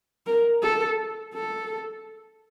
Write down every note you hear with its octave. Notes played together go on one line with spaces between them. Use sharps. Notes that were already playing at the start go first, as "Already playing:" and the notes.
A#4
A4
A4